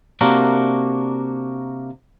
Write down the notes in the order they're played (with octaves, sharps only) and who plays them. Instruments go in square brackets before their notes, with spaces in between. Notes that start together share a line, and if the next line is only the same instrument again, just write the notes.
[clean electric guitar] C3 A#3 D4 F#4 A#4